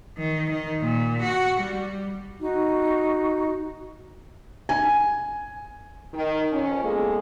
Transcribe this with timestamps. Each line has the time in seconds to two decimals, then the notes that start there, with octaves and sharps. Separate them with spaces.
0.18 D#3
0.51 D#3
0.82 A#2
1.22 F#4
1.61 G3
2.40 D#4 F#4
4.69 G#5
6.14 D#3
6.52 F2 C#4
6.82 E2 G#3 A#3 A4